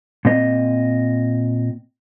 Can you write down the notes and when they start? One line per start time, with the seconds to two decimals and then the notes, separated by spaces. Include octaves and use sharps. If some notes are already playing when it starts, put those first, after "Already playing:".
0.25 A#2 C4 D#5